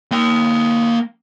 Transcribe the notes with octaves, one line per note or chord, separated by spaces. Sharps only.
A#3 G5